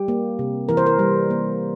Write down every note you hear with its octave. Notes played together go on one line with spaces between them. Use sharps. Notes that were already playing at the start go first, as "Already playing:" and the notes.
Already playing: G3 G4
A#3
C3
E3 A#4
C5
A#4
G3
A#3